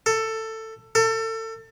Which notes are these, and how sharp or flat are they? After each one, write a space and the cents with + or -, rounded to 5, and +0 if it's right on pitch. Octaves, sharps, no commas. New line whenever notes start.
A4 +15
A4 +30